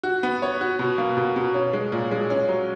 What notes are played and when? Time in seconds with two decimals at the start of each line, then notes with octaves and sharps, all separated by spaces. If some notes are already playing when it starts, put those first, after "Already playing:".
0.03 F#4
0.23 B3
0.42 C#5
0.61 F#4
0.79 B2
0.98 A#3
1.17 B2
1.36 B2
1.54 C#4
1.73 G#3
1.92 A#2
2.11 G#3
2.30 C#4
2.49 F#3